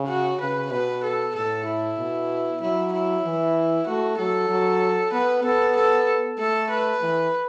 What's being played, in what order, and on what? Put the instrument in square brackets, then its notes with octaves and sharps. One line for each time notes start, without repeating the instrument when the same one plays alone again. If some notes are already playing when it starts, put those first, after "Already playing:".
Already playing: [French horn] C#3
[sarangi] F#4
[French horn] C#3 [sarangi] B4
[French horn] B2 [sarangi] B4
[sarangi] A4
[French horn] A2 [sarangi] A4
[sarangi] E4
[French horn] B2
[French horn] F#3 [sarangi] E4
[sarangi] E4
[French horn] E3
[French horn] A3 [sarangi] F#4
[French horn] F#3 [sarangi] A4
[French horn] F#3
[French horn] B3 [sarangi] B4
[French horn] B3 [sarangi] A4
[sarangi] A4
[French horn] A3 [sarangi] A4
[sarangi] B4
[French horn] E3